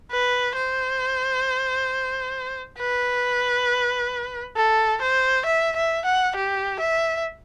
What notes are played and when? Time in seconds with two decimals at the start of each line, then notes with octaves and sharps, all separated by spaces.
0.11 B4
0.56 C5
2.79 B4
4.56 A4
5.02 C5
5.46 E5
5.76 E5
6.05 F#5
6.36 G4
6.80 E5